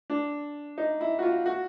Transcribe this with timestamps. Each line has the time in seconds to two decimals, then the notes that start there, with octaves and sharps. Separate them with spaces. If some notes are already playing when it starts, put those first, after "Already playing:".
0.10 D4
0.78 D#4
1.01 E4
1.19 F#4
1.22 F4
1.46 F#4